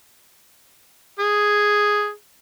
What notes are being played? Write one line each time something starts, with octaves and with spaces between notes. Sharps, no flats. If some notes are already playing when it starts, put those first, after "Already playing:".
G#4